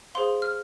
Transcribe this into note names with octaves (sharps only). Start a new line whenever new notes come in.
G#4 C5 F5 C6
F6